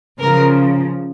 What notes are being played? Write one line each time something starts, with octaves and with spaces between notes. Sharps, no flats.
C#3 F3 A#4